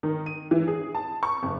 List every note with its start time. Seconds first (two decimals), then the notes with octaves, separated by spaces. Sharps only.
0.03 D#3
0.26 D#7
0.51 E3
0.68 G#4
0.95 A5
1.23 C#6
1.43 F#1